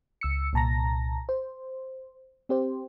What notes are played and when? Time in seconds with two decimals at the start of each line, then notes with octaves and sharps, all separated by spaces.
0.21 C#2 E6 C#7
0.53 C2 A#2 A5 A#5 A#6
1.29 C5
2.49 C4 G4 C5